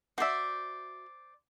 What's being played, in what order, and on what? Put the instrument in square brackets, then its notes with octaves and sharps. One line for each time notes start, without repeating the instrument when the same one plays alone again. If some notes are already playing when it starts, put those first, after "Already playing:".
[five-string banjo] F#4 E5 [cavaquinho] C5 D5